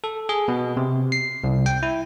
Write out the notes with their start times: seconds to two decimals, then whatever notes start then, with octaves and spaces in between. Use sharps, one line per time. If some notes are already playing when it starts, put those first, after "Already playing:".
0.04 A4
0.29 G#4
0.48 B2
0.77 C3
1.12 C7
1.44 C2
1.66 G5
1.83 E4